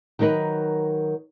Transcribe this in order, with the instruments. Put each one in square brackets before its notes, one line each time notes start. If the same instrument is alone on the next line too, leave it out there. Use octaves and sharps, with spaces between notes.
[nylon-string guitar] D#3 F#3 D#4 A#4 B4